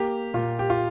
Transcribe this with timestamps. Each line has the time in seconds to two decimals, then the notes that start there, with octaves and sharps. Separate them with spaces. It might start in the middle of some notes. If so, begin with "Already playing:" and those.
Already playing: A#3 G4
0.34 A#2 F4
0.59 G4
0.70 F4